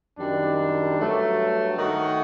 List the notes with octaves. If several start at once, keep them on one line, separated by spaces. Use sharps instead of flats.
F#2 D#3 G3 D4
G2 F#3 A3
D#3 A3 D#4 F#4